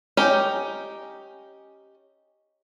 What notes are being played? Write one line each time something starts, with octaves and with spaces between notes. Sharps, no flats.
C#4 D#4 G4